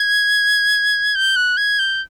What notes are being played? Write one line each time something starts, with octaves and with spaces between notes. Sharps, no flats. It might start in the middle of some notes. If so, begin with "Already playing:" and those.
Already playing: G#6
G6
F#6
G#6
G6